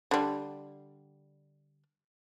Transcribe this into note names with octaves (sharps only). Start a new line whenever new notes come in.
D3 G3